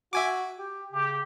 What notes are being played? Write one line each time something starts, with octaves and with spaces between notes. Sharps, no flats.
F#4 E5 G#5 D6
G4
C#3 G4